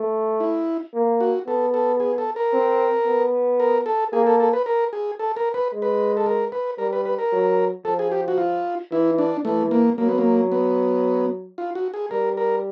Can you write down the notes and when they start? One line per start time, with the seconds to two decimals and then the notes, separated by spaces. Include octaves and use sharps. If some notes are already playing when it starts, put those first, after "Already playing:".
Already playing: A3
0.40 E4
0.94 A#3
1.21 F#4
1.47 B3 A4
1.74 A4
2.00 G#4
2.18 A4
2.36 A#4
2.53 C4
3.06 B3
3.60 A#4
3.86 A4
4.13 A#3 G#4
4.27 A4
4.40 A4
4.53 B4
4.66 A#4
4.93 G#4
5.19 A4
5.36 A#4
5.54 B4
5.73 G#3
5.82 B4
6.17 A4
6.26 A#4
6.52 B4
6.78 G3 A#4
6.93 B4
7.05 B4
7.18 A#4
7.32 F#3
7.85 F3 A4
7.99 G#4
8.12 G4
8.28 F#4
8.38 F4
8.92 E3 E4
9.18 D4
9.45 E3 A3
9.71 A#3
9.98 F#3 A#3
10.09 B3
10.18 A#3
10.52 B3
11.58 F4
11.75 F#4
11.94 G#4
12.11 G3 A#4
12.37 A#4